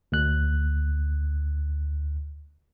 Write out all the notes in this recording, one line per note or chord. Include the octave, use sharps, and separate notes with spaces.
D2 F#6